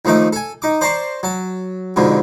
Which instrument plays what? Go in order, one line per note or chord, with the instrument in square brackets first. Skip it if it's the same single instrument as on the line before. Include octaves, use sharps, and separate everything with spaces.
[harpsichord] D#2 F3 A3 D#4 D6
A4 G#5
D#4 D6
C5 D5 A5 A#5 C6 C#6
F#3 A5
F2 G#2 B2 D3